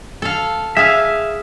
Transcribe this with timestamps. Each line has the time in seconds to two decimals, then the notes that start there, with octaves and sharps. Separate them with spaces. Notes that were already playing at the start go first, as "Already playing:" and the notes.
0.22 A4 F5
0.77 G#4 E5 F5